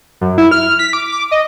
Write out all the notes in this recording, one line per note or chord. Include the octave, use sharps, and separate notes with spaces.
F#2
E4
F6
B6
D6
D6
D#5